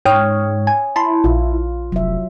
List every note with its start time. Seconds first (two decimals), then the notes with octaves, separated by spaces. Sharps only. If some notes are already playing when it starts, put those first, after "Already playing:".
0.06 G#2 C#5 G5 D#6 F6
0.67 G#5
0.96 E4 A5 B5 C6
1.24 A#1 F4
1.92 F1 F#3 E5